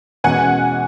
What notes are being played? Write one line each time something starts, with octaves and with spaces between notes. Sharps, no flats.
E2 B2 G#3 C#4 F#4 F#5 G#5